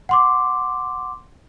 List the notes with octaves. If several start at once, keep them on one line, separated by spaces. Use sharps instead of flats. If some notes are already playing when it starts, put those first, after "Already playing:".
F#5 C6 D6